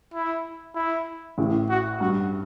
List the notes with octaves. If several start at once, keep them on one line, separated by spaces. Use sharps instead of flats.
E4
E4
A1 A2
F#4
G2 F#4